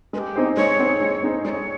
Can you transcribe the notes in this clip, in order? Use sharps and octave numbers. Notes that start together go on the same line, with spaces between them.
G#3 B4
G4
C4 D#4 G#4 C5
G#3 C#5
C4 D#4 G#4 C5
G#3
C4 D#4 G#4 C5
G#3 C#5 D5